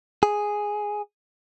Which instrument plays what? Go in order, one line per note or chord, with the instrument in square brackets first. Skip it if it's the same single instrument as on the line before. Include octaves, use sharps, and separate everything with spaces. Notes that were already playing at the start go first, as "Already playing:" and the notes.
[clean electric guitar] G#4